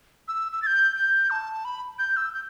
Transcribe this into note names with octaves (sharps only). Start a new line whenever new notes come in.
E6
E6
A6
G6
G6
A5
B5
G6
E6
G6